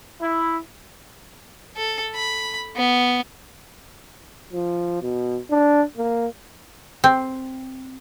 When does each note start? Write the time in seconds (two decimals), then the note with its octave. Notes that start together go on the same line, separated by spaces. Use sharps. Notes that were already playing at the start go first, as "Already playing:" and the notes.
0.20 E4
1.77 A4
2.15 B5
2.76 B3
4.53 F3
5.02 B2
5.51 D4
5.98 A#3
7.04 C4